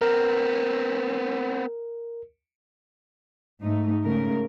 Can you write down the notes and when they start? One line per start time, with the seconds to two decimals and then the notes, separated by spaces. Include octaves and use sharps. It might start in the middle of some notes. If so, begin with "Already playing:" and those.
0.01 B3 C4 A#4
3.62 G#2 A3 D#4
4.02 G#2 C#3 A3 A#4